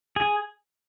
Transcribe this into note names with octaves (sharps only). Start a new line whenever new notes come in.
G#4